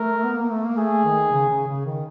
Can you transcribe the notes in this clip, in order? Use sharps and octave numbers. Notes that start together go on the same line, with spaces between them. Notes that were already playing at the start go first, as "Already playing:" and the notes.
Already playing: A3 A#4
B3
A#3
A3
A#3
A3 G#4
D#3
C#3
C#3
C#3
D#3